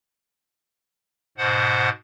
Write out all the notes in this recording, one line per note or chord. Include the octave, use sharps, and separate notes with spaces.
G#2 B2 C5 F#5